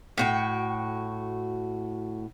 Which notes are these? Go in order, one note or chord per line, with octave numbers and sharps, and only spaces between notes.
A2 F#4 G5